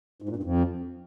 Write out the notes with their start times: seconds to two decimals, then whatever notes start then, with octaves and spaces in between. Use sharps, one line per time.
0.22 G#2
0.29 A#2
0.36 G2
0.43 F2